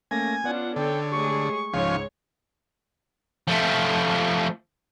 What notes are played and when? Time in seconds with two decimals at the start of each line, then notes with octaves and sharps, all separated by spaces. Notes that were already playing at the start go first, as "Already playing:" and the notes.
0.11 A3 A#3 C#4 G#5 A#6
0.44 B3 C#4 D4 F4 D5 F#5
0.76 D3 A4 C#5 G5
1.12 G#3 A3 G4 G#4 C#5 C#6
1.73 C#2 G#2 F3 G#3 C#4 C#5
3.48 F3 A3